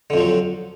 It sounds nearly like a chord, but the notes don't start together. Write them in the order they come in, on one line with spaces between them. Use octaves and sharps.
D3 F2 F3 F#3